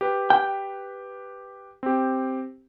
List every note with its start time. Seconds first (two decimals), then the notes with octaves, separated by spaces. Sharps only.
0.01 G4 B4
0.30 G5
1.83 C4 G4